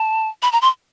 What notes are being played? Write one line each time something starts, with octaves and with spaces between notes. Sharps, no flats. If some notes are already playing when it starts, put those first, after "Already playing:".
Already playing: A5
B5
A#5
C6